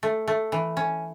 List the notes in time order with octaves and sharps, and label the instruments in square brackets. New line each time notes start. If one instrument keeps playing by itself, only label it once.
[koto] A3
A3
E3
C#4